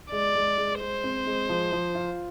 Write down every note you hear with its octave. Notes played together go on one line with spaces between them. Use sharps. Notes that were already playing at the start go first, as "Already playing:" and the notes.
G#3 D5
G#3
G#3
G#3 C5
C4
G#3
F3
F3
F4